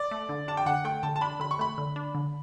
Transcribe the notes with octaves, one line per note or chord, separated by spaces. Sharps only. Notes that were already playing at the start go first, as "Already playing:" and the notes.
Already playing: D5
A3
D3
D4 A5
G5
D3 F#5
A3 G5
D3 A5
A5
D4 B5
D3 B5
C#6
A3 B5
D3
D4
D3